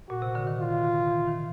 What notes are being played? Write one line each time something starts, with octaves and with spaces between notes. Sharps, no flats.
A#2 F#4
C3
D3
D#3
F4
E3
D#3